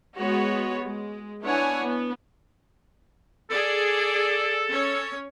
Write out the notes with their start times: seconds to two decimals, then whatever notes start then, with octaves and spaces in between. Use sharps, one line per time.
0.16 G#3 B3 F#4 C#5
0.85 G#3
1.43 B3 D4 E4 C#5 F#5 G#5
1.83 B3
3.50 G#4 A4 D5
4.70 C#4 C#5